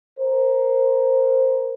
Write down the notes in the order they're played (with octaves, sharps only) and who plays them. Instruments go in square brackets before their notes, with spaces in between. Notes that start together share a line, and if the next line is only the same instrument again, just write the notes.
[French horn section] A#4 C5